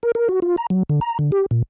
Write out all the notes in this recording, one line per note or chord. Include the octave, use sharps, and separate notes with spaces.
A#4
A#4
F#4
F4
A#5
F#3
D3
A#5
D3
G4
A#2